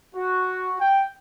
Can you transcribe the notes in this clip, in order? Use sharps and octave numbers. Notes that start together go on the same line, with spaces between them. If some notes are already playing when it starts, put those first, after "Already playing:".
F#4
G5